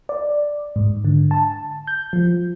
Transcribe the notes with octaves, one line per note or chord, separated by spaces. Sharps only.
D5
G#2
D3
A5
G6
F3